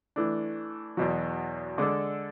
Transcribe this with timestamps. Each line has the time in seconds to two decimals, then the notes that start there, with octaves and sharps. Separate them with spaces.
0.16 E3 A3 D4
0.97 E2 B2 F#3
1.78 D3 G#3 D4 A4